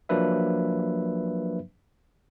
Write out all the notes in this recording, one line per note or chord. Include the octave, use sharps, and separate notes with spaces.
F3 F#3 A#3 D4 B4 E5